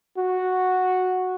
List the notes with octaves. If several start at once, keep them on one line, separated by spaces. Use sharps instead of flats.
F#4